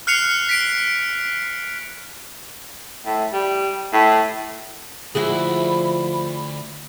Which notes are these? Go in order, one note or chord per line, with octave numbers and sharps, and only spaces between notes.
F6 F#6 C7 C#7 F7
B6 D7
A2
G3
A2
D2 F3 E4 F#4 G#4 B5